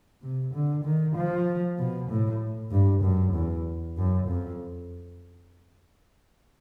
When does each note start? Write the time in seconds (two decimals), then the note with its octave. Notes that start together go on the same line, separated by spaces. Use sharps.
0.22 C3
0.54 D3
0.84 D#3
1.16 F3
1.78 B2
2.10 A2
2.72 G2
3.03 F#2
3.34 E2
3.97 F#2
4.28 F2